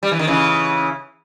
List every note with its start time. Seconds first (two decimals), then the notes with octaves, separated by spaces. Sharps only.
0.03 G3
0.12 E3
0.19 D#3
0.27 C#3 E3